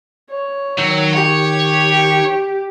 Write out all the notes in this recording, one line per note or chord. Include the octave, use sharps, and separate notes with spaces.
C#5
D#3 F#3 E6 G6
G4 C#5